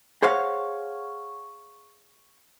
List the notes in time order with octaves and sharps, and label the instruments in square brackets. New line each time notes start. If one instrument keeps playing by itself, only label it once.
[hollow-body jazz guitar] G#4 C5 C#5 F5 F#5